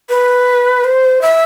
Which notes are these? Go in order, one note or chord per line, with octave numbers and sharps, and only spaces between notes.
B4
C5
E5